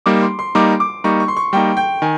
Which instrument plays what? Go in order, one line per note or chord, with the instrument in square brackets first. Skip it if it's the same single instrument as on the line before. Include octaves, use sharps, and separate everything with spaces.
[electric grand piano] G3 A#3 D#4 [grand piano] D6
[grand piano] C6
C6
[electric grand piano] G3 A#3 D#4 [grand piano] D6
[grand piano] D6
[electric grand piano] G3 A#3 D#4 [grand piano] C#6
[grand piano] C#6
C6
C#6
[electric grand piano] G3 A#3 D#4 [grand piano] G5
[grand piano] G5
[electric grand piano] D#3 [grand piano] G#5